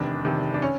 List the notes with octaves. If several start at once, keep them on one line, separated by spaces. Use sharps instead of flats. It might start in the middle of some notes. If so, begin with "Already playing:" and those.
Already playing: F1 E2 C3 D#3 D4
F1 E2 C3 D#3
D4
C#4